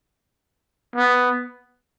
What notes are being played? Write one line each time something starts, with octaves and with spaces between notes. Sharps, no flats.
B3